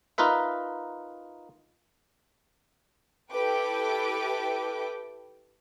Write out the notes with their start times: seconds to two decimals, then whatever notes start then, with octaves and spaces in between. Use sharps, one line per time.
0.18 D#4 F4 A#4 B4 E5
3.31 E4 G4 A4 B4 G5 D6